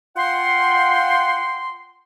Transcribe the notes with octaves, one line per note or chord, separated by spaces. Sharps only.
F4 F#5 G5 C6